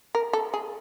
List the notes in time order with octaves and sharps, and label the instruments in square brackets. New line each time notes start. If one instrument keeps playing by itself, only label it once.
[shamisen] A#4
A4
G#4